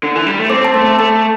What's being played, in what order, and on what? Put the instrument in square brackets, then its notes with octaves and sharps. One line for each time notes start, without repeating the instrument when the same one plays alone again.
[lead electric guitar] D3
E3
G3
A3
[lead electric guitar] C4 [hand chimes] D6
[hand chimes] A5
[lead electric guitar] A3 [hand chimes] C6
[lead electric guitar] A3 [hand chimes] A5